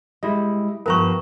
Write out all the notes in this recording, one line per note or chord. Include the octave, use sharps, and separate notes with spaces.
G3 G#3 E4 D#5
G2 F3 B3 A#4 B4 A#5 C#6